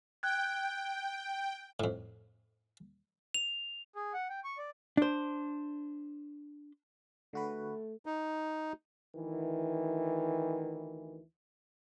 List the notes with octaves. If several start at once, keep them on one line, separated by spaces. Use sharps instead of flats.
G5 F#6 G#6
F2 A2
F7
G#4
F#5
G5
C#6
D5
D4 C5
D3 A3 F#4 B4
D#4
D2 D#3 E3